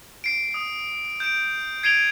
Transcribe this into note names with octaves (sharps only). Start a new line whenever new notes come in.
C7 D7
D#6
G6 D7
G#6 C7 D7 D#7 F7 G7